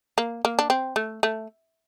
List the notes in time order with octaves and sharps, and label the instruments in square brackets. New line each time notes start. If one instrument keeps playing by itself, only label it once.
[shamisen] A#3
A#3
D4
C4
A3
A3